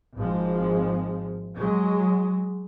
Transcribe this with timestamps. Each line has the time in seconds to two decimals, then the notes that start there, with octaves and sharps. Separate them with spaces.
0.16 G#1 F3 G#3
1.56 F#3 G#3